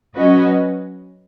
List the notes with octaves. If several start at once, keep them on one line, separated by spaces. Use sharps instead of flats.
F#3 C#4 F#4 B4 D#5